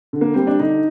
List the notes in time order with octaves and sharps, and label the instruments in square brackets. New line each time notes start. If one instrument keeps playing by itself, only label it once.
[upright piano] D3
A#3
G3 C4
D4
D3 D#4